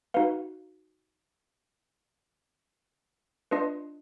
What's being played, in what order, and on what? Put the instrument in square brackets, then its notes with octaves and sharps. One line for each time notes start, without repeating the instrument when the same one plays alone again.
[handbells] D#4 F#4 B4 F5
D4 F4 B4 D#5